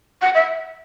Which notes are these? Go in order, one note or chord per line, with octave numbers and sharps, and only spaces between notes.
F#5
E5